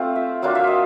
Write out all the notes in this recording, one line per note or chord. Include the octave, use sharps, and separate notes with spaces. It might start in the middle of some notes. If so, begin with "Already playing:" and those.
Already playing: A3 C4 F4
E5
F#3 A#3 D4 F4 F5
E5
D#5